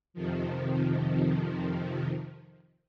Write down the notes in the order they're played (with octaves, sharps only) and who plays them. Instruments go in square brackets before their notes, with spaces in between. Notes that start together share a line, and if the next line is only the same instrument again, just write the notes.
[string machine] F2 C3 D#3 F3